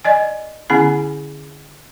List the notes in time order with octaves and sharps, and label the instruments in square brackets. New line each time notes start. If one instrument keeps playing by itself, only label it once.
[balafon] D5 D#5 G#5
D3 B3 C#4 E4 B5